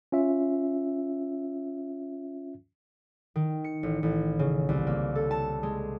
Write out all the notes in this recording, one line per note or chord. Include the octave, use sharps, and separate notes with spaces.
C#4 F4 E5
D#3
C#7
A1
A1
C#3
C2
A#3
A4
A5
G#3